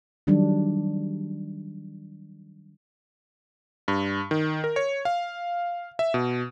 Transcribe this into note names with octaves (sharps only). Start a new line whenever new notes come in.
D#3 F#3 G3 D4
G2
D#3
A#4
C#5
F5
E5
B2